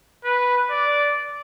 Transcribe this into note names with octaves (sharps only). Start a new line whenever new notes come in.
B4
D5